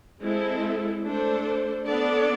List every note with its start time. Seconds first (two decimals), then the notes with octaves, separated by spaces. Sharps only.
0.22 G#3 C4 E4 A4
1.04 A3 D4 A4 C5
1.86 B3 D4 A4 D5